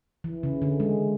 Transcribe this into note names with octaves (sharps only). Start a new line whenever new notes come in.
E3
C#3
D3
G#3